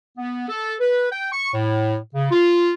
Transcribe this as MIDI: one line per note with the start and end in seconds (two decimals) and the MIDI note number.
0.18 0.45 59
0.49 0.75 69
0.80 1.07 71
1.12 1.31 79
1.32 1.54 85
1.54 1.96 45
2.15 2.30 49
2.31 2.73 65